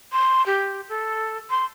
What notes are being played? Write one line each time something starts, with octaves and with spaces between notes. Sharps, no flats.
C6
G4
A4
C6